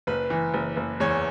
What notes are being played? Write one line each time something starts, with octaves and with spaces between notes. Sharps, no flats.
F#1 B4
E3
F#1
F#1
E2 C#5